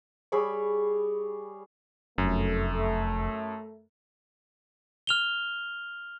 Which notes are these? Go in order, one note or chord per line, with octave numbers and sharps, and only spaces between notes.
G3 G#4 C#5 B5
F1 F#2 A3
F6 F7 G7